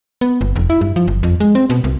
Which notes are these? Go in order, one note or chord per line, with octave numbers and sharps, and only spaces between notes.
B3
G1
F1
E4
G2
F3
G1
F2
G#3
C4
B2
C2